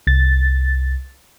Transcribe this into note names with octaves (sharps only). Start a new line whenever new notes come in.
C2 A6